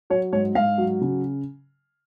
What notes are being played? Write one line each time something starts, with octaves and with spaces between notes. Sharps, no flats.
F#3 C#5
G#2 C#5
G#2 F5
F#3
C#3